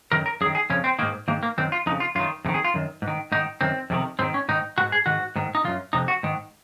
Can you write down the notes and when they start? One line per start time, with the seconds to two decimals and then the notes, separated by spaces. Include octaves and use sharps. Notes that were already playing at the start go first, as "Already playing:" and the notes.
0.12 F#2 D#3 A#4
0.26 A#4
0.41 F#2 G#4
0.46 D#3
0.55 G#4
0.70 F2 C#3 C#4
0.84 C4
0.99 G#2 D#3 A#3
1.28 G#2 D#3 A#3
1.43 A#3
1.58 F#2 D#3 C4
1.72 F4
1.86 F2 D#4
1.90 C#3
2.00 F4
2.15 F#2 F4
2.20 D#3
2.45 F2 C3
2.49 D#3
2.54 G#4
2.65 F4
2.74 F#2 D#3
3.02 G#2
3.08 D#3
3.32 G#2 D#3 D#4
3.61 F#2 D#3 C4
3.90 F2 C3 D#3
4.19 G#2 D#3 C4
4.34 C#4
4.48 G#2 D#3 D#4
4.78 D#3 F#4
4.81 G#2
4.92 G#4
5.06 G#2 D#3 F#4
5.36 G#2 D#3
5.55 D#4
5.64 F#2 D#3 F4
5.93 F2 C3 D#4
6.08 F#4
6.23 G#2 D#3